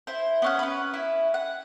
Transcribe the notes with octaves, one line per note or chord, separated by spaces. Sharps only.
E4 C5
B3 C#4 F#5
C#4 B4
E4
F#5